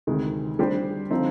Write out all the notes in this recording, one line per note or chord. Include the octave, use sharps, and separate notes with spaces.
D2 C3 D#3 G#3
G3 D4 G4 C5
D3 F3 C4 D#4